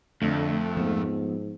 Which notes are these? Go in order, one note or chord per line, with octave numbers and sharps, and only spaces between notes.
F2 D3 A3
G#2 F3 B3